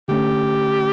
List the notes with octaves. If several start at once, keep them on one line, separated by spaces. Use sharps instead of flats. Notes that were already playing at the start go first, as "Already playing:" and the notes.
D3 A3 C#4 G4